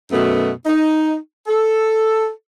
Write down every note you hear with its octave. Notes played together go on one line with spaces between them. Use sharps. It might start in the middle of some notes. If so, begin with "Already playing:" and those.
F#2 B2 A3 B3
D#4
A4